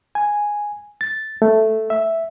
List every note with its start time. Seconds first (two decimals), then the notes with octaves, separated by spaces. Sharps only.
0.15 G#5
1.01 A6
1.42 A3
1.90 E5